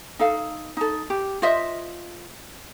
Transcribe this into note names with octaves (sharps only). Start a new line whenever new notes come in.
D#4 A4 F5
D#4 A4
G4
F4 C5 D#5 E5